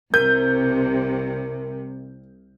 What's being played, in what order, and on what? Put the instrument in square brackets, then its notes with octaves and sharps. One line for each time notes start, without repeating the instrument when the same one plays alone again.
[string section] C2 C3 [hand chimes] A#4 [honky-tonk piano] G6